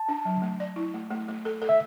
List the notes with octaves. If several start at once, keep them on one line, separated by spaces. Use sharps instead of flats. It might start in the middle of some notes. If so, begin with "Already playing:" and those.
Already playing: A5
D4
F#3
A3
D5
E4
A3
A3
A3
A4
A4
E5